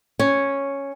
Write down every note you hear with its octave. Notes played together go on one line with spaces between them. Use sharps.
C#4